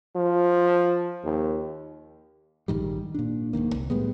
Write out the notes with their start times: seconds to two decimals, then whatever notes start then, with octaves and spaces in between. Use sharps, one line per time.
0.15 F3
1.24 D#2
2.68 A#1 G#2 D#3 G3
3.14 A#2 D4
3.53 D1 F#2 D#3 A#3
3.74 C2
3.90 A2 G3 G#3 B3